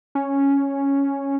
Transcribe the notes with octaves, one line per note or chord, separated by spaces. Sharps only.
C#4